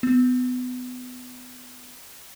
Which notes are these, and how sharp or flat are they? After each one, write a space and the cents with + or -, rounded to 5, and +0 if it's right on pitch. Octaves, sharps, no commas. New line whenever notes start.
B3 +25